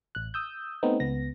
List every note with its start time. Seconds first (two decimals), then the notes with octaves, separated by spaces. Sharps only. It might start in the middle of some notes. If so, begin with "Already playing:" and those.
0.15 A1 F#6
0.34 D#6 E6 G6
0.83 A3 B3 C4 D#4
1.00 C#2 B3 A#6